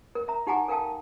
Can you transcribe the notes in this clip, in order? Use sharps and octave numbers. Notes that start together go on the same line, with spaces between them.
A#4
E5 A#5
D#4 G4 F#5 G#5 A#5 D6
A4 A#4 F5 G5 A5